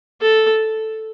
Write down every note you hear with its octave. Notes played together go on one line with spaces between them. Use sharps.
A4